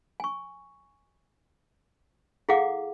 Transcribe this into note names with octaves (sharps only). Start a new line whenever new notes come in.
G#5 C#6
E4 G#4 A4 F5 F#5 D6